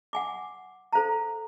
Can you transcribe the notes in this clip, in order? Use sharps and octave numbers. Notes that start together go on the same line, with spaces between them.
F#5 G#5 D6
A4 C5 F5 A#5